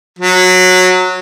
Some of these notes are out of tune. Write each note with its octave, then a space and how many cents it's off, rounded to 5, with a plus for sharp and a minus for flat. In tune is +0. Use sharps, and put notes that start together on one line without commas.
F#3 -15